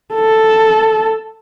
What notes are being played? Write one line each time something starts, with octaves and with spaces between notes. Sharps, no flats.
A4